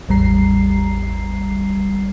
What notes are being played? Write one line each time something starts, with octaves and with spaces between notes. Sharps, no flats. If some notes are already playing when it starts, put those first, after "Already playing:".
A1 E2 G3 A#5 C7